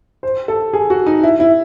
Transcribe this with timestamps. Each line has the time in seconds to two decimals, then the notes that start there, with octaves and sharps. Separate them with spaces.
0.23 C5
0.48 A4
0.73 G#4
0.90 F#4
1.06 D#4
1.23 E4
1.40 E4